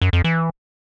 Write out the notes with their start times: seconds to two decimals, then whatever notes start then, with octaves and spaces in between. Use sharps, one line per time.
0.02 F#2
0.13 F2
0.24 E3